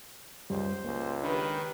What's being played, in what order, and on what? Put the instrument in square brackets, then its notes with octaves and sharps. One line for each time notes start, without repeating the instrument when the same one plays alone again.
[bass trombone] C#2 [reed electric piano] F#2 G3 [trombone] C5
[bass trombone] C#2 [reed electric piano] A#3
[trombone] D#3 [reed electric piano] D4 [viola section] G4 B4